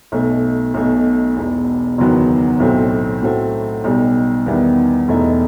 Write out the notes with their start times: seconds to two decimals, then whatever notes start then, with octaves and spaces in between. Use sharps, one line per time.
0.12 B1 B2 A3
0.74 B1 B2 A3
1.36 E1 E2 B2
1.98 F#1 E2 D#3 F#3 B3
2.60 B1 A2 F#3 A3 C4
3.22 A2 F#3 A3 C4
3.84 B1 B2 G3
4.46 E2 D#3 G3 B3 E4
5.08 E1 E2 B2 A3 D#4